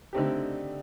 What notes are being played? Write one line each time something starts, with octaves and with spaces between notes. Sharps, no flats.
D3 A3 C4 D#4 G4